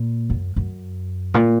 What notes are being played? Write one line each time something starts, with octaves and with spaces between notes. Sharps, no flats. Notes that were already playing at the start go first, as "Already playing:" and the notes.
Already playing: A#2
F#2
F#2
A#2